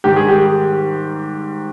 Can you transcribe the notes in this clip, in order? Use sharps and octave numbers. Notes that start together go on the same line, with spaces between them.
G#2 D#3 G3 G4
G#4
G4